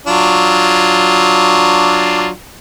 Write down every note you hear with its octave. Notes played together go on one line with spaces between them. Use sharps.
F#3 D4 F4